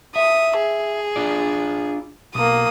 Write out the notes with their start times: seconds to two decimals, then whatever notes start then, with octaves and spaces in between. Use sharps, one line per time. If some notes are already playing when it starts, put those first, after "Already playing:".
0.16 E5 D#6
0.58 G#4
1.16 D4 F4 D5
2.35 B1 A#3 D#6